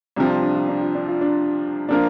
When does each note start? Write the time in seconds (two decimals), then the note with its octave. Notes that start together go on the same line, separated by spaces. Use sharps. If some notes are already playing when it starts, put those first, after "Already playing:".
0.16 C2 C3 F3 D4
0.29 F4
0.42 D4
0.55 F4
0.69 D4
0.81 F4
0.95 D4
1.08 F4
1.21 D4
1.89 F3 A#3 D4 F4 A#4